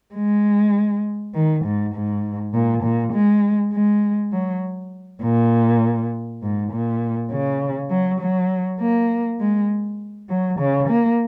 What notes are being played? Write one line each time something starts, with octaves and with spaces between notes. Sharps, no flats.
G#3
D#3
G#2
G#2
A#2
A#2
G#3
G#3
F#3
A#2
G#2
A#2
C#3
F#3
F#3
A#3
G#3
F#3
C#3
A#3